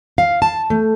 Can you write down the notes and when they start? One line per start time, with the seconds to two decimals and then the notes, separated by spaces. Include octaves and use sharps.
0.18 F5
0.42 A5
0.70 A3